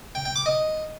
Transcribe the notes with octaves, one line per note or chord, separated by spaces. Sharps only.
G5
G5
D6
D#5